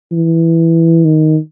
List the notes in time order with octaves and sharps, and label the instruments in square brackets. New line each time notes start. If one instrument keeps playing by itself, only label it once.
[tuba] E3
D#3